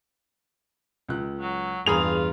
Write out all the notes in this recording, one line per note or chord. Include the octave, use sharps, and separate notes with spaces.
C#2 F#6
F#3
E2 G2 F4 G#4 A#5 B5 F7